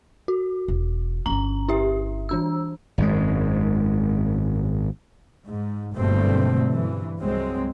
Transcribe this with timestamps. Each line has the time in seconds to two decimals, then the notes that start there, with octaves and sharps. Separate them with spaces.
0.28 F#4
0.68 E1
1.26 G1 C#4 A#5
1.69 E4 G4 E5
2.29 E3 D4 E6
2.98 G#1 F#2 G#3
5.46 G#2
5.95 F#1 G2 B2 D3 A3 C4
6.70 G2 E3
7.22 C2 F#3 G#3 C4